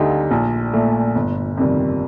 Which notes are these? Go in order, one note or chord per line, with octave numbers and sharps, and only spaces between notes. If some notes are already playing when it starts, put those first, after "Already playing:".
Already playing: D2 D3 A3 D#4 G4
A#1
A#2 A3
G1
F2 C3 D#3 G3